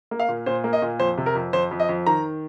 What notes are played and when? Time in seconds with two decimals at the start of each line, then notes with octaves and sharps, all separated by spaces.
0.11 A#3
0.20 F5
0.29 A#2
0.46 A#2 C5
0.64 A#3
0.73 D#5
0.82 A#2
1.00 F2 C5
1.17 C3
1.26 A#4
1.35 F2
1.53 F2 C5
1.71 F2
1.80 D#5
1.89 F2
2.07 D#3 A#5